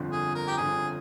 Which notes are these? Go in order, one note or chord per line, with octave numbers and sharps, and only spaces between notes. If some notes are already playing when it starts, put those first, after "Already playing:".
Already playing: G1 F2 D3 F3
G#4
A#4
G4
G1 F2 D3 F3 G#4